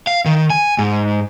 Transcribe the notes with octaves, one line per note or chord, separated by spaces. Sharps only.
F5
D#3
G#5
G#2